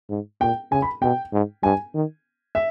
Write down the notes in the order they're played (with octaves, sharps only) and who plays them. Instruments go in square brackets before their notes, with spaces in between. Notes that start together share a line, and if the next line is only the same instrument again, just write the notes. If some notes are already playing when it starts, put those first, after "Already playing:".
[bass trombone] G#2
[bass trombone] A#2 [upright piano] G5
[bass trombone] C#3 [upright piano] G#5
[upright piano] B5
[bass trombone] B2 [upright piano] G5
[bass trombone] G#2
[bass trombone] G2 [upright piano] G#5
[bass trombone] D#3
[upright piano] E5